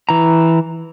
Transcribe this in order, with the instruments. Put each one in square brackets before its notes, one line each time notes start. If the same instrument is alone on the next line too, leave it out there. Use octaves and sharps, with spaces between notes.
[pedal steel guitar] E3 A#5